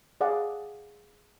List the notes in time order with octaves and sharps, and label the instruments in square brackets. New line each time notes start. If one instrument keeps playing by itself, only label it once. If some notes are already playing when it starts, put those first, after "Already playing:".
[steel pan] G#4 D5 F5 F#5